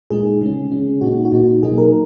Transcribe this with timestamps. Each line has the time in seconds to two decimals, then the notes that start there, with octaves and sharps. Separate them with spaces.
0.10 A#2 G#3 D#4 G#4
0.41 C#3 G#3 C#4
0.71 C#3 G#3 C#4
1.01 A#2 A#3 D#4 F#4
1.25 F#4
1.32 A#2 A#3 D#4
1.63 B2 F#3 A#3 D#4 G#4
1.78 A#4